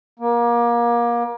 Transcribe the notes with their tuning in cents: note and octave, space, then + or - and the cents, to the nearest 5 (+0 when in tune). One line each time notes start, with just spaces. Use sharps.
A#3 +30